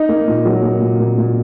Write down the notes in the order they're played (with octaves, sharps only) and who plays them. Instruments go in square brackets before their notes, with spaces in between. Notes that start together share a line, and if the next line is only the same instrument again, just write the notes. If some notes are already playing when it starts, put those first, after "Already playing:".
Already playing: [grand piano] D#4
A#3
A#2
F#3
A#3
A#2
A#2
A#2